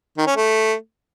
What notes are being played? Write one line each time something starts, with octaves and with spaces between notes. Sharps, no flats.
D#3
C#4
A3